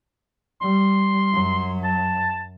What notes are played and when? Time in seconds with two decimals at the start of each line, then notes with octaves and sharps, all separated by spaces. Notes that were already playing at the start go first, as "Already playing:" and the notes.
0.62 G3 C6
1.33 F#2 F#3
1.84 A5